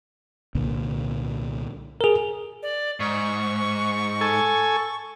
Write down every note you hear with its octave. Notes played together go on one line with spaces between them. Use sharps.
C2 A#2 D3
G#4 A#4
D5
G#2 C#6
A4 G#5